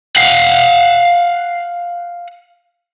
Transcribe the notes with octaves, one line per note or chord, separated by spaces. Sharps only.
F5 F#5